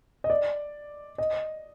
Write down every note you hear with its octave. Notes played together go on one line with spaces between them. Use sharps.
D#5
D5
D#5